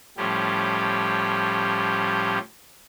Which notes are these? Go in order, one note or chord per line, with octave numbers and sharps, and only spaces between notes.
A2 F3 G3 C#4 G4